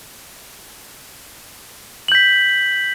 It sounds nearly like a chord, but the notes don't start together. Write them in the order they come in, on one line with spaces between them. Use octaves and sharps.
F#7 G6 B6